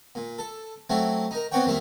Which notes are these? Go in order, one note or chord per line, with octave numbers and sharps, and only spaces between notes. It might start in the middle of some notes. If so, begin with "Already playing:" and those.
A#2
A4
F#3 A3 C4 E4
D#4 A#4
B3 C4 D4 F#4 C#5 G5
F2 D#3 G3 A#3 E5